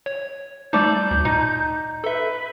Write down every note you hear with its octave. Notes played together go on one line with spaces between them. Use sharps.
C#5
G3 A3 D#4 A4 D5 G6
D2
A#2 D#4
A4 B4 E5